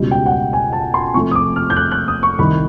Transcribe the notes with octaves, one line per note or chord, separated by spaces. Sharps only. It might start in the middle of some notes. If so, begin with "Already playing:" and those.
Already playing: C#2 B2 G3
G5
F#5
G5
G#5
A5
C6
C3 F3 A3 C#6
D#6
D6
F6
G6
F#6
F#6
D#6
C#6
C2 C3 D#3 B5